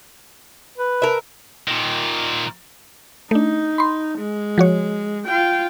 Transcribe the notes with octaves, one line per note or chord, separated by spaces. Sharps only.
B4
A#4 E5
A#2 D#3
A3 D4 D#4
B5 C6
G#3
F3 F#4 C#5
F4 G5